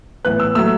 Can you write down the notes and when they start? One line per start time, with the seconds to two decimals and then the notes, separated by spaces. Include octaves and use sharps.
0.25 A2 E3 B3 F#6
0.40 E6
0.55 F#3 A3 E6